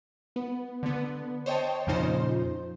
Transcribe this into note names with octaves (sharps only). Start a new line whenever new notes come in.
B3
D3 B3
C5 C#5 D#5 G5 A5
F2 A#2 C#3 F3 D#4 C5